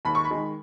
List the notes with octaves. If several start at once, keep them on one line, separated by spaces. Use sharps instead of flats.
D#2 B5
C#6
B5
D#3 G#3